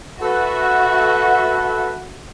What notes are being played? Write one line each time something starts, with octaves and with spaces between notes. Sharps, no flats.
F#4 A4 B4 E5